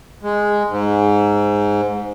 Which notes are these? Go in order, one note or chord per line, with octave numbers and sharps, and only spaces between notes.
G#3
G#2